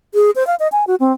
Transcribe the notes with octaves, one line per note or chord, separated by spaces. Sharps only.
G#4
C5
F5
D#5
G#5
F#4
C4